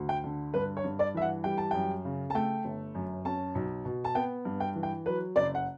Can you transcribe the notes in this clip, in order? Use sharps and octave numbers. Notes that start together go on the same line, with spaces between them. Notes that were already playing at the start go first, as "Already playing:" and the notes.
Already playing: D2
G5
D3
G2 B4
C#5
G2
D5
E3 E5
F#5
G3 G5
A5
F#2 G5
C#3
A5
A3 G5
G1
F#2
C#4 A5
B1
B2
A5
B3 G5
G2
G5
E3
G5
F#3 B4
F#1 D5
F#5